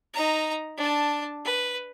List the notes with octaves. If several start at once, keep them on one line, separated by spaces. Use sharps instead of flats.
D#4 A#5
D4 A5
B4